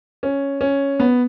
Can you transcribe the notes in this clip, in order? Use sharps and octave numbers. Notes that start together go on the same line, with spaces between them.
C#4
C#4
B3